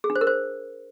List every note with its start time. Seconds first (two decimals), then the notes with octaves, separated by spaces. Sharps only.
0.04 G#4
0.10 D4
0.16 C5
0.21 A#4
0.27 C5